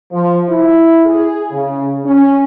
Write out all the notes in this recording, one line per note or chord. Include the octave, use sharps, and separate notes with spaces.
F3
E4
G#4
C#3
C#4